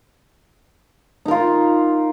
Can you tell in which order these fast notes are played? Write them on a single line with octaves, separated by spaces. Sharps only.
D#4 A#4 F4